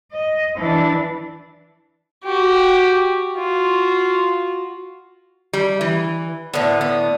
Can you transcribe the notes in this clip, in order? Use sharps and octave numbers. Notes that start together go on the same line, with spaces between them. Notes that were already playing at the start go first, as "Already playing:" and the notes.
D#5
E3 D4
F#4 G4
F4 F#4
G3
E3
A2 D3 B3
B3